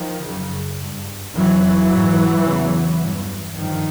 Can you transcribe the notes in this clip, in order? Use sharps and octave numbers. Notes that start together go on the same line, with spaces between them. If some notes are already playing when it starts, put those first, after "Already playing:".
Already playing: D#3 F3
F#2 C#3
G2
F2 C3 E3 F#3
G#2
E2 C#3
G2
G2 D#3 F3